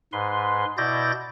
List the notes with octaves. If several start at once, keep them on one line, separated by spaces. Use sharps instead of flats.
G#2 B4 C6
B2 E4 D5 G6 A6 A#6